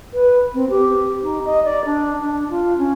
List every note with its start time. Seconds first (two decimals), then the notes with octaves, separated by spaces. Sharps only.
0.14 B4
0.54 C4
0.70 G4
1.23 D#4
1.45 D#5
1.64 D5
1.85 D4
2.20 D4
2.50 F4
2.78 C#4